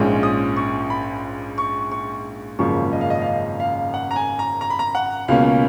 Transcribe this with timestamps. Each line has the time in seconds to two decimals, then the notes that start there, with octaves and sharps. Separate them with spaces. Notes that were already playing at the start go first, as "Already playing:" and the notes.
Already playing: A#1 G#2 F3 G#3 C#4
0.23 D#6
0.56 C#6
0.90 B5
1.58 C#6
1.92 C#6
2.59 G#1 F#2 C#3 F3 A#3 C#6
2.93 D#5
3.01 F5
3.10 D#5
3.22 F5
3.26 D#5
3.60 F5
3.94 F#5
4.11 A#5
4.16 G#5
4.39 A#5
4.61 A#5
4.70 B5
4.79 A#5
4.95 F#5
5.28 C#2 B2 A#3 C#4 F5